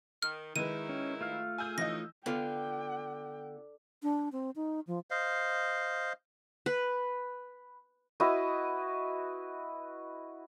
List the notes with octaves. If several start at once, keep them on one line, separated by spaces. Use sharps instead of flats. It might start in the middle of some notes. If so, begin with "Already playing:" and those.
D#3 F6
D#3 G#3 D#4 E4 B4 D#7
C#4
A3 F4 F5
G#4 G#5 E6 G6
C3 E3 C#4 D#4 D#5 A#6
D3 B3 F4 G5
D4
C4
D#4
F3
C5 D#5 F5
B4
E4 F#4 B4 D#5